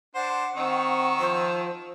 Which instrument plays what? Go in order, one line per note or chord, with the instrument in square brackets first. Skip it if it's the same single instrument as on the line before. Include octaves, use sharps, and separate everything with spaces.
[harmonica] D4 C5 [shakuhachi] F#5
[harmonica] D#3 D#4 E6 [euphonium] C4 [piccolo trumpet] C#6
[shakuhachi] F#5
[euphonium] F3 [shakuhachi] C5